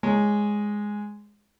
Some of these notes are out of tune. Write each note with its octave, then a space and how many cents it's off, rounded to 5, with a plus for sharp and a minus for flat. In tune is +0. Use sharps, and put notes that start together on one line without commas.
G#3 +0 C#5 +0